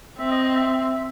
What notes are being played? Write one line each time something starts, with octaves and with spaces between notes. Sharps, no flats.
C4 E5
D#5
D#5
E5